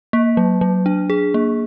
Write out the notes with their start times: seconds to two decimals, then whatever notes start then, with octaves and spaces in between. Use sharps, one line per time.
0.13 A#3
0.37 F#3
0.61 F#3
0.86 D4
1.10 G#4
1.34 A#3